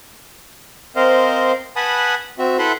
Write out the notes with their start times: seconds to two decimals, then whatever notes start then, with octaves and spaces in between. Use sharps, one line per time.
0.96 C4 A#4 C5 D#5 F5
1.76 B4 F#5 G#5 A5 B5 D#6
2.39 C4 F#4 E5
2.59 E4 A4 B4 E5 F#5 C6